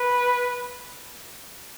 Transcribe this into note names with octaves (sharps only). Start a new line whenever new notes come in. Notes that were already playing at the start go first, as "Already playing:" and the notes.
Already playing: B4